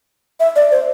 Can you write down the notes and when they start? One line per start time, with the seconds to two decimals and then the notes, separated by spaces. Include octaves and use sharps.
0.40 E5
0.56 D5
0.71 C5